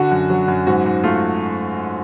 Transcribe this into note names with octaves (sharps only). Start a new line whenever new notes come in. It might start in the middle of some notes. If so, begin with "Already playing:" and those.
Already playing: D3 F#4
F#2
F#3
F#2
G#2 F#4
G#2
A3 F4